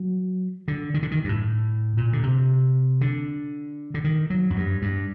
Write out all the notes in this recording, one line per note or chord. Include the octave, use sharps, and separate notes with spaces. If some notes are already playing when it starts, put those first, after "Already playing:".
Already playing: F#3
D3
D#3
D3
D#3
G2
A2
A#2
D3
C3
D3
D3
D#3
F#3
F#2
G2
G2